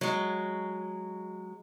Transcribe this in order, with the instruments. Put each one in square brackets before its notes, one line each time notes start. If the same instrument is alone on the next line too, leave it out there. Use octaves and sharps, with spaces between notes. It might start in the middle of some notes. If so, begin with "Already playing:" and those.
[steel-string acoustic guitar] F#3 G#3